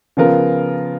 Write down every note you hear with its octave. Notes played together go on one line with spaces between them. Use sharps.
C#3 F3 B3 F4 A#4